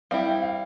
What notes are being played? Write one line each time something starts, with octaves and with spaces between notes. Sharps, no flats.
G3 C4 E4 F5
G5
F5